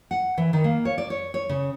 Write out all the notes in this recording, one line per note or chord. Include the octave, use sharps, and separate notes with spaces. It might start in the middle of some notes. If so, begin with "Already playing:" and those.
F#5
E3
D#3
A#3
C#5
D5
C#5
C#5
C#3